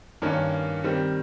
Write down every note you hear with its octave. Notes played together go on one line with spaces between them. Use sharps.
G2 D#3 A#3 C#4
D#3 G3 C4